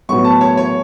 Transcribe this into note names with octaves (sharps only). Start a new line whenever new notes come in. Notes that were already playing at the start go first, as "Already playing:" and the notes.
A2 F#3 B3 C#6
A5
C#5
C#5